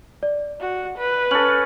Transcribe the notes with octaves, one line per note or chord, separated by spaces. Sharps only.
D5
F#4
B4
C#4 A4 F#7